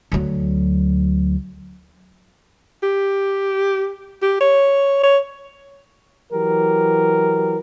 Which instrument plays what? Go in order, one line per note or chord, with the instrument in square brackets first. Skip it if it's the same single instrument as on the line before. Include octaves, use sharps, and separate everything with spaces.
[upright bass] D2 F#3
[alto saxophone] G4
G4
C#5
C#5
[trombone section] E3 F#3 G4 A#4